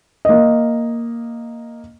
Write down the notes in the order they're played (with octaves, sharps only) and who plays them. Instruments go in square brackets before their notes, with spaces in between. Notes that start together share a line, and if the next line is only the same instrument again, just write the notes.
[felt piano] A#3 D#5